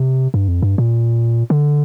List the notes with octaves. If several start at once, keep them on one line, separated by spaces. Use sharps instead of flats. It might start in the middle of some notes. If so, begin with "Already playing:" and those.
Already playing: C3
G2
F2
G2
A#2
D3